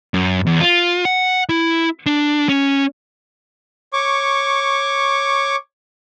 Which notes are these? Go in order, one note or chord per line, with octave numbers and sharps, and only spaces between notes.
F#2
E2
F4
F#5
E4
D4
C#4
C#5 C#6 D6